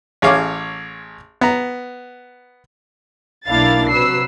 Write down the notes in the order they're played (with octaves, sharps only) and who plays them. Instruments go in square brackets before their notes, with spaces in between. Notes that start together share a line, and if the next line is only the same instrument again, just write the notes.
[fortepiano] A1 G#4 C#5 F5 D6
B3 A#5
[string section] B1 A#3 D4 E4 F5 A6
C3 F#3 B4 E6 C7